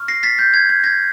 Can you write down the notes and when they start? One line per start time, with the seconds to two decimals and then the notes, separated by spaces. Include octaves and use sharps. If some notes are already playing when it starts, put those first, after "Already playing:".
Already playing: C#6 F6
0.08 A#6 C7
0.23 A6 B6
0.38 G6 A6
0.54 G#6
0.69 G#6
0.84 G#6 A#6